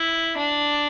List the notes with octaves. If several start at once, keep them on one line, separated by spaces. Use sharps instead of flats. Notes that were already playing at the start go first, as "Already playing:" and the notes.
Already playing: E4
D4